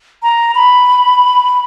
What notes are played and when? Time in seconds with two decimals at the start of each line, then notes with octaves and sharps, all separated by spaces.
0.23 A#5
0.55 B5